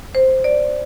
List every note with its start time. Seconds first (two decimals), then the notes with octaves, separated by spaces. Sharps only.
0.15 C5
0.44 D5